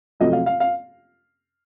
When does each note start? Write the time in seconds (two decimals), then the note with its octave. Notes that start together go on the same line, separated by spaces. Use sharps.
0.20 F2 C3 F#3 A3 D#5
0.33 F5
0.46 F5
0.60 F5